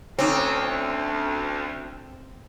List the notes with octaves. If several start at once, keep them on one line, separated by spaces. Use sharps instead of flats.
D2 D3 C4 C#4 D#4 A4